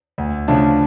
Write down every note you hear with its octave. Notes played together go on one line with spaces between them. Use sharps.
D2
C#3 F3 A3 D4